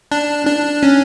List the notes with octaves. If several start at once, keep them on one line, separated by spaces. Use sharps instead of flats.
D4
D4
C#4